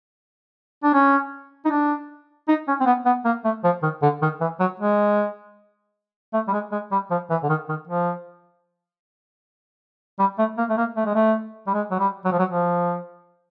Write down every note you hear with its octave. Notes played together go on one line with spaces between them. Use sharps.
D4
C#4
D#4
D4
D#4
C#4
C4
B3
B3
A#3
A3
F3
D#3
D3
D#3
E3
F#3
G#3
A3
G3
G#3
G#3
G3
F3
E3
D3
D#3
D#3
F3
G3
A3
A#3
A3
A#3
A3
G#3
A3
G3
G#3
F#3
G3
F#3
F3
F#3
F3